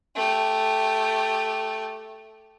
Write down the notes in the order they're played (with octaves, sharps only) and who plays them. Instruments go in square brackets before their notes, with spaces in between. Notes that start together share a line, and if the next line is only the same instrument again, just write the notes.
[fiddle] A3 G4